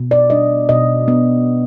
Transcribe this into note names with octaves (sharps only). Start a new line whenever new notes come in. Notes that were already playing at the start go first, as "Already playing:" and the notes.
Already playing: B2
D5
G3 B3 D4 D#5
B2 D#5
B3 D4